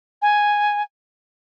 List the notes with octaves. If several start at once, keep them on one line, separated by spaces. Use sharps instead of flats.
G#5